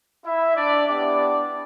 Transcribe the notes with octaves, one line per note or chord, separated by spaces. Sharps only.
E4 E5
D4 D5
B3 D4 E4 G4 D5